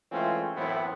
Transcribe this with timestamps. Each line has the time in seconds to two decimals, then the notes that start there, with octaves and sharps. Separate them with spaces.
0.12 E3 G#3 A3 C4 C#4 F4
0.56 F#2 A2 E3 B3 C4 E4